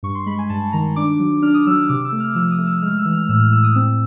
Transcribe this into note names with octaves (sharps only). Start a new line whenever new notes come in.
G2 C#6
C6
G#3 B5
G#5
G2 A5
D#3 A#5
D4 D6
F#3
D4 F6
D#6
F#3 E6
E6
C3 D6
E6
A3
F6
F3 E6
D#6
A3
E6
G#3 F6
E6
E3
F6
A2 E6
F6
A2 E6
D#6
C4 E6